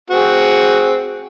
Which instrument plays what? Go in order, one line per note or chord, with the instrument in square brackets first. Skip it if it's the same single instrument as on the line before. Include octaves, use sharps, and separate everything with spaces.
[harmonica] C4 F#4 G#4